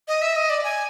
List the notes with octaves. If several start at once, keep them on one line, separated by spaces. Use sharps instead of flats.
D#5
E5
D#5
D5
G#5